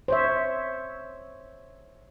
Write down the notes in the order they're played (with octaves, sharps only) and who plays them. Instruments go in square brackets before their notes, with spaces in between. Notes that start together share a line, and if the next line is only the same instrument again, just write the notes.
[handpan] C5 C#5 E5